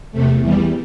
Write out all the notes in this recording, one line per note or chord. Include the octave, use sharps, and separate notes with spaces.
E2 C3 A3
E2 E3 G3